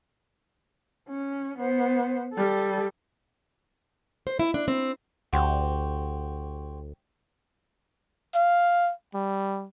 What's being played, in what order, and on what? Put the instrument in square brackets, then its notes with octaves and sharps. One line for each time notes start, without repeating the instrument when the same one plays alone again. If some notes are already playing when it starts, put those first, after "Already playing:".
[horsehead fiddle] C#4
B3 C5
G3 A4
[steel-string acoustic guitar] C5
E4
D4
C4
[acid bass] D2 [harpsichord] F#4 G4 C5
[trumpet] F5
G3